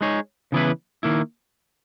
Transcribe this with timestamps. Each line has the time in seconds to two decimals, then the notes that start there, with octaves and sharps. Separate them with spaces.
0.01 G#3 D#4 G#4 C#5
0.52 C#3 E3 B3 E4 B4
1.03 D#3 A#3 E4